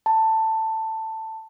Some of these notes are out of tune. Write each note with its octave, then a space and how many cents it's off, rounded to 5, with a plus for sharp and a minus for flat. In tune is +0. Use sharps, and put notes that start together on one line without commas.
A5 +10